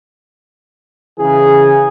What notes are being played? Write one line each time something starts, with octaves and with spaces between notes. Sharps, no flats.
C#3 E3 G#4